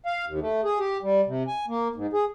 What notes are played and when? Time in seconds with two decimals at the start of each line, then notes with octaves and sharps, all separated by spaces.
0.06 F5
0.26 D#2
0.41 A3
0.64 G#4
0.79 G4
1.03 G3
1.27 C3
1.48 G#5
1.68 A#3
1.96 G#2
2.13 G#4